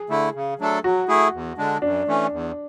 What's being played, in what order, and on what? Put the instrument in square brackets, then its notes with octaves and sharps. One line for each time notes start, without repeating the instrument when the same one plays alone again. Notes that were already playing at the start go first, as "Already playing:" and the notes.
Already playing: [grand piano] G#4
[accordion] D3 A3 E4
C#3
F#3 A3 D4 A4
[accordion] F#3 [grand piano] F#4
[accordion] A3 E4 G#4
E2
D3 G#3 D4
[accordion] F#2 [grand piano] D4
[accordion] E3 A3 C#4
E2